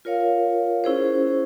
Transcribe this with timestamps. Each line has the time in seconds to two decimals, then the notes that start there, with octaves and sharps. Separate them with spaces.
0.05 F4 A#4 C#5 F5
0.84 C#4 E4 G#4 C5